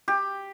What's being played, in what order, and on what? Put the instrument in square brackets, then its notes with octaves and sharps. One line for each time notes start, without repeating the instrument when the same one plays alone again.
[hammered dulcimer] G4